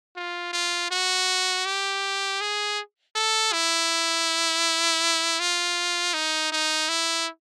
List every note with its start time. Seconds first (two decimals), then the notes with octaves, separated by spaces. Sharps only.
0.16 F4
0.53 F4
0.91 F#4
1.66 G4
2.41 G#4
3.16 A4
3.53 E4
5.40 F4
6.14 D#4
6.52 D#4
6.89 E4